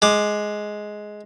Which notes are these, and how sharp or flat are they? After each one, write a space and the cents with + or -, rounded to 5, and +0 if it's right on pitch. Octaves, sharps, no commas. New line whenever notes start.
G#3 +10 D6 +20